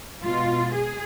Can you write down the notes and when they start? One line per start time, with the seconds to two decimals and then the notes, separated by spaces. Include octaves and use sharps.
0.23 B2 G#3 F4
0.74 G#4